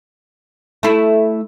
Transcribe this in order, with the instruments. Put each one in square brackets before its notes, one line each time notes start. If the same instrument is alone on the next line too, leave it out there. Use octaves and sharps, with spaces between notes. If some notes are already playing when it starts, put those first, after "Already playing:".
[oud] A3 E4